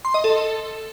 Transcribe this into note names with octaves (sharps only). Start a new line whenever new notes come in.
C6
D#5
A4